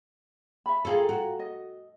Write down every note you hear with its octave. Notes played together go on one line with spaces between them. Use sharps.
E5 B5
F4 G#4 A4 F5 A#5
F#4
D#5